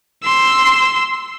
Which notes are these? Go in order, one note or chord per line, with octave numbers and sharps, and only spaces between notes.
C6 E6